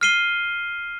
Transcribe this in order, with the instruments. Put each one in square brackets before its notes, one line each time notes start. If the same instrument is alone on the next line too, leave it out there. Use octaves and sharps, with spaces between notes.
[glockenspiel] F6 C7 D#7 G7